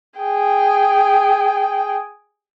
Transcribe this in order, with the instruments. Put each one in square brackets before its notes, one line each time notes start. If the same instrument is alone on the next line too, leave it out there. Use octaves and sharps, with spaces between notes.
[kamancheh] G#4 G5